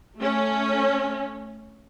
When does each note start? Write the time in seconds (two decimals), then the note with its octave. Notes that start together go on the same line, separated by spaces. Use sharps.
0.19 A3 C#4